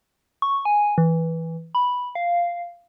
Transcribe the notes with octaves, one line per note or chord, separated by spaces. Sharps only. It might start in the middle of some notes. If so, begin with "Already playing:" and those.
C#6
G#5
E3
B5
F5